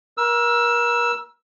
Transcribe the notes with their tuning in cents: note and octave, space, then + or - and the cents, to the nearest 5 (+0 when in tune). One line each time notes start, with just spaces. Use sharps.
A#4 +35 E6 +10